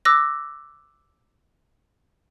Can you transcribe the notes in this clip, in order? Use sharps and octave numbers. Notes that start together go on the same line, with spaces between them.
D6 E6 F#6 A#6